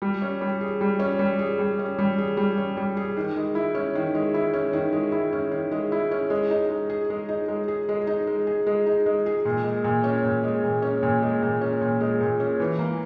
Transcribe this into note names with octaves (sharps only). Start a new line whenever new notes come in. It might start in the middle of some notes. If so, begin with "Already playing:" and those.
G3
C#4
G3
G#4
G3
C#4
G3
G#4
G3
C#4
G3
G#4
G3
C#4
G3
G#4
D#3
G#3
E4
C#4
D#3
G#3
E4
C#4
D#3
G#3
E4
C#4
D#3
G#3
E4
C#4
G#3
D#4
G#3
G#4
G#3
D#4
G#3
G#4
G#3
D#4
G#3
G#4
G#3
D#4
G#3
G#4
A#2
G#3
A#2
C#4
A#2
G#3
A#2
C#4
A#2
G#3
A#2
C#4
A#2
G#3
A#2
C#4
E3
A#3